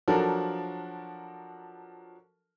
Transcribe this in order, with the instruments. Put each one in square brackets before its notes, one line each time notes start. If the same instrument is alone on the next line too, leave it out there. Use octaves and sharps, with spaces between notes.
[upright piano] F3 F#3 D4 F#4 A4 A#4